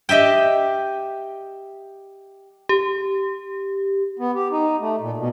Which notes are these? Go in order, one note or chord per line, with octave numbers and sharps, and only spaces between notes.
G4 D#5 E5 G5
G4
B3
G4
D#4
A3
A#2
B2